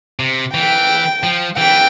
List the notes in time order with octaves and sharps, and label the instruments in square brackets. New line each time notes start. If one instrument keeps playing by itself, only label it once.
[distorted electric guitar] C3
[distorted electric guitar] E3 [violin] G5
[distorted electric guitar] F3
[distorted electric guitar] E3 [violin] G5